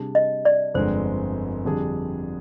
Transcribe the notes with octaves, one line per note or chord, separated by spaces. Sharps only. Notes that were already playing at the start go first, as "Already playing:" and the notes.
Already playing: C3 G3 D4 G#4
D#5
D5
G1 F2 D3 G#3 C4 C5
F2 D3 G3 D4 G#4